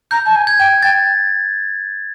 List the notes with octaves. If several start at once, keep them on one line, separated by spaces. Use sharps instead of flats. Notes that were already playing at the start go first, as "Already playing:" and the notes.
A#5 G6
A5
G#5
G#6
G5
G5 A6